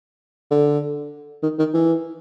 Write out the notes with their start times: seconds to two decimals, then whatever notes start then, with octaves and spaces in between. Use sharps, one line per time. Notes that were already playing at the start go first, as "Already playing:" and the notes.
0.51 D3
1.43 D#3
1.59 D#3
1.74 E3